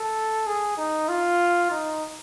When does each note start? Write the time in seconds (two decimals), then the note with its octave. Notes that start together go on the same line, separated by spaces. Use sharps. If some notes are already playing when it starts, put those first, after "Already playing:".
Already playing: A4
0.46 G#4
0.77 D#4
1.08 F4
1.71 D#4